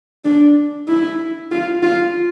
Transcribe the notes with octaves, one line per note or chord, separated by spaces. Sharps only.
D4
E4
F4
F4